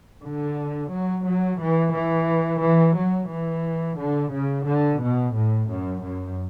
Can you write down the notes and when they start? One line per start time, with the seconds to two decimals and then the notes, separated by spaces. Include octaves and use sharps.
0.22 D3
0.91 F#3
1.25 F#3
1.59 E3
1.93 E3
2.61 E3
2.96 F#3
3.29 E3
3.98 D3
4.32 C#3
4.66 D3
5.00 B2
5.34 A2
5.68 F#2
6.03 F#2